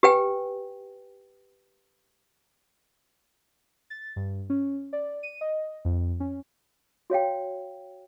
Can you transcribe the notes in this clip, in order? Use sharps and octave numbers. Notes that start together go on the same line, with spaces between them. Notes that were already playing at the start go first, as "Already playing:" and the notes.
G4 B4 G5 G#5
A6
G2
C#4
D5
D#7
D#5
F2
C#4
F#4 C#5 F5 G5